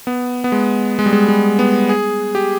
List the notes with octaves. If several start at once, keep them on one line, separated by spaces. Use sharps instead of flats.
B3
B3
G#3
G#3
G3
G#3
G#3
B3
G#4
G4